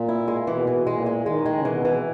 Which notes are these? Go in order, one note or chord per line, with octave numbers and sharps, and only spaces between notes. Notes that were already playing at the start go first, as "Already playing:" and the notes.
Already playing: A#2
E4
G#3
B2 E3
E3
A#2 G#3
G#3
D#3 G#3
G#3
C#3
B2 E3
E3